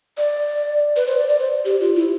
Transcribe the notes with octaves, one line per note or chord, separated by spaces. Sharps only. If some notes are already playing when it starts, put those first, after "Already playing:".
D5
B4
C5
D5
D5
C5
G4
F4
E4